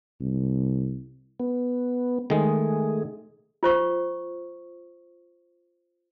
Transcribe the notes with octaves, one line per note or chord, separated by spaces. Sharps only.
C2
B3
D#3 G#3 A3 G#4
F4 C5 C#6